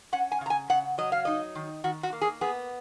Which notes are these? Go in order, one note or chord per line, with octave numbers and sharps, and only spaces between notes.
C#4 F#5
G#5
C#3 A#5
G#5
C#3 F#5
F#3 D#5
F5
D#4 D#5
D#3
D#3 F#4
F#4
A#3
G#4
B3 G#4